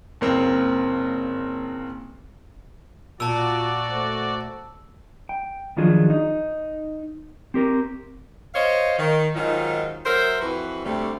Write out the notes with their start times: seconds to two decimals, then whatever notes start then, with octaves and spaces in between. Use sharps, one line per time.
0.21 F#1 A#3 C4
3.20 A#2 F4 F#4 D5 A5 E6
3.89 A3 C5
5.29 G5
5.77 D#3 F3 F#3 D4 F4 G#4
6.10 D#4
7.54 C4 G4 A#4
8.55 C5 C#5 D#5 F5
8.99 D#3
9.35 G#2 D#3 F#3 D#4 F4
10.06 F#3 A#4 C5 E5
10.41 F2 E3 F#4 B4
10.85 D2 C3 G3 A3